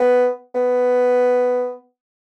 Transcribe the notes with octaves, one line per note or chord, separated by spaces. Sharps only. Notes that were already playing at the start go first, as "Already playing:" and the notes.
Already playing: B3
B3